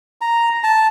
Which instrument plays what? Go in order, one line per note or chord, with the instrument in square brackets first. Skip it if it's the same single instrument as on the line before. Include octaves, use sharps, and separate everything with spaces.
[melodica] A#5
A5